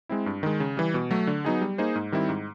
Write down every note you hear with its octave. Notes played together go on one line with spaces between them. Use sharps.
G#3 C4 E4
G2
D#3 G#3
C#3
E3 G3
B2
F#3 A3
D3
F#3 B3 D#4 G#4
G3
A#3 D#4 G#4 C5
G#2
D#3 G3 C4 E4
G#2